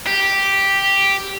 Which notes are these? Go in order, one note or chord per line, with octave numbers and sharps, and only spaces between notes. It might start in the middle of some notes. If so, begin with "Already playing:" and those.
G4